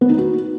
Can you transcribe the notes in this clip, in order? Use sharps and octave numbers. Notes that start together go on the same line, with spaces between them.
B3
D#4
F#4